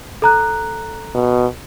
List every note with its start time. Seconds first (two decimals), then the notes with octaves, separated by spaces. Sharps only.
0.22 A4 A#5 F#6
1.15 B2